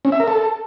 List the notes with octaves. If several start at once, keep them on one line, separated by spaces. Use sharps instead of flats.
C#4
E5
A#4
A4